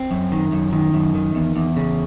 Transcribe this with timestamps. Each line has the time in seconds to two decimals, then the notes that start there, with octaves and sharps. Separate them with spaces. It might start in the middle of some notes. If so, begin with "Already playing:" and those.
Already playing: C4
0.11 F#2
0.32 D#3
0.52 F#2
0.73 D#3
0.94 F#2
1.15 D#3
1.35 E2
1.56 E2
1.76 C#3